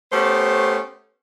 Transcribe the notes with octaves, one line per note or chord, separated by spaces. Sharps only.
A3 B3 C#4 G4 C5